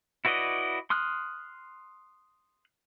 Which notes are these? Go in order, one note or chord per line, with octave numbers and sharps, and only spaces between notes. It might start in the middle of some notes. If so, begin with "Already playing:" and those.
E4 F#4 B4 D5 D#5
C6 D#6 F6 F#6